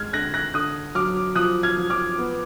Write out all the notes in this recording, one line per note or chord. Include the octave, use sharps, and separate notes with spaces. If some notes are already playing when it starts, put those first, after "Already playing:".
Already playing: G#3 F6 G#6
D3 F#6 A#6
F#6 A#6
D3 D#6 F#6
F#3 D6 F6
F3 D#6 F#6
F6 G#6
F3
D6 F6
B3